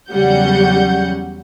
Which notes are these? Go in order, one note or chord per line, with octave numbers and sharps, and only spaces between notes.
E2 C#3 F#3 G3 F#5 G6